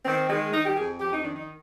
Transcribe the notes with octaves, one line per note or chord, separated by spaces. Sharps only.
D#3 C4
D#3 G#3
D#3 D#4
G4
F2 G#4
F2 G4
D#4
D#3 D4
D#4